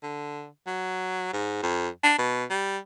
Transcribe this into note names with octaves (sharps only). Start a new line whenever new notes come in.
D3
F#3
G#2
F2
D4
B2
G3